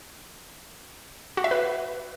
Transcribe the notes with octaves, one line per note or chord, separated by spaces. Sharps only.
F#4
E5
B4